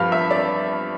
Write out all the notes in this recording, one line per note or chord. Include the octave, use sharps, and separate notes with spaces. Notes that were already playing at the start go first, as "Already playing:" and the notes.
Already playing: G2 F3 G4 F5
E5
D5